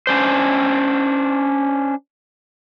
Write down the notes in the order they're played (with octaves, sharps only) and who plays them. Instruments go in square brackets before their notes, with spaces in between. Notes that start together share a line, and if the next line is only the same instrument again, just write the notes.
[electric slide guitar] C#4 D4 C5